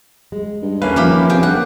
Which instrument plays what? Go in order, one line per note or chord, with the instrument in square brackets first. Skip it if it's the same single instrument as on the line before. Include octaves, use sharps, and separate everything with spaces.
[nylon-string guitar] G#3
[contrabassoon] G2
[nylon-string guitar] E2 A4 E5 [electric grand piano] A#3 C#4 B4 [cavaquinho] F5
[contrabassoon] D#1 [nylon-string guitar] F3 [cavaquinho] E4 G4 B5
[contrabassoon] C3 [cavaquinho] G#4 F5 G5
[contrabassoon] D3 [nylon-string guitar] A#3 A4 [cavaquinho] F#5